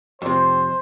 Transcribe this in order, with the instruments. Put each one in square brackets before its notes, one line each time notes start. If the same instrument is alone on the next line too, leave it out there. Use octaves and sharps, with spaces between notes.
[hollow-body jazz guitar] F2 C3 [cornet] C5